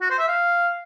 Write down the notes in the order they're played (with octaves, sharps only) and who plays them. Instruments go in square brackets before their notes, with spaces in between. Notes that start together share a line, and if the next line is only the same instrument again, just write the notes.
[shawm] F#4
C5
E5
F5